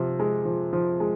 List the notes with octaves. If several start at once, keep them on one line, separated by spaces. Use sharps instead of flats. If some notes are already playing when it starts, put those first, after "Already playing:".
Already playing: C3 F3
G#3
F3
F3
G#3